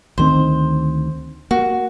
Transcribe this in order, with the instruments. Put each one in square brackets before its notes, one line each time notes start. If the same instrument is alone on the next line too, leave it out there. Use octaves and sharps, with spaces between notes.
[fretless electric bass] D2 D#3 C4 [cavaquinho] C5
[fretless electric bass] A#3 [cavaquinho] F#4